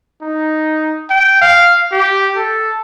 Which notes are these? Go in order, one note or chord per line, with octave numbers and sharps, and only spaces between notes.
D#4
G5
F5
G4
A4